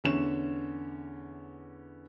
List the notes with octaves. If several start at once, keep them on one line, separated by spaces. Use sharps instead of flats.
E2 D3 C#4 E4 E7